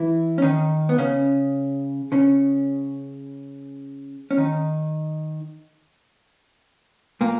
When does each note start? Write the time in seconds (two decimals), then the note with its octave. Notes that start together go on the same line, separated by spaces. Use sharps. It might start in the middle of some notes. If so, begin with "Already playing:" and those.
Already playing: E3 E4
0.38 C#4
0.42 D#3 D#4
0.89 B3
0.98 C#3 C#4
2.12 C#3 C#4
4.31 C#4
4.38 D#3 D#4
7.21 A#2 A#3